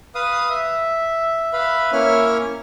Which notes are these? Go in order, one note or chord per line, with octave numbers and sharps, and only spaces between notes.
B4 F5 D#6
E5
B4 E5 F5 B5
A#3 C#4 E4 C#5 E5 F6